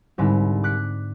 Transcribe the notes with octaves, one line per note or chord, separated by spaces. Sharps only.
C2 G#2 D3 A#4 A5 B5
D6 F#6 B6 C#7